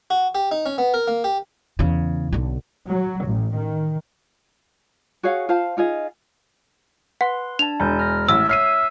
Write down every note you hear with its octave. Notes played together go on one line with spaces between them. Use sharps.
F#4
G4
D#4
C#4
B3
A#4
A#3
G4
E2 C#3
B1 D3
F#3
A1
D#3
F#4 G#4 C#5 F5
F4 C5 F5 A5
D#4 F4 G#4 D#5
B4 F#5 C6
D4 A5 F7
E1 G#5 G6
F6 A#6
A1 E5 E6
C#5 E5 F6 C7 D#7